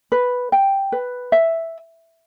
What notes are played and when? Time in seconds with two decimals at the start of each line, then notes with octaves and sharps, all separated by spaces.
0.12 B4
0.52 G5
0.92 B4
1.32 E5